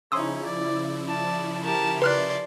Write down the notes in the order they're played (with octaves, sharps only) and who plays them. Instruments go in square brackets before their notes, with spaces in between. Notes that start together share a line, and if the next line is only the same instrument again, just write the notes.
[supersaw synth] C#3 F3 E4 [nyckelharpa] C#4 D#4 [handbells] C6 D#6 E6
[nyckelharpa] D5
D5 A5
[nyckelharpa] G4 A#4 [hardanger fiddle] A5
[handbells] B4 F6 F#6 [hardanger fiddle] D5 C6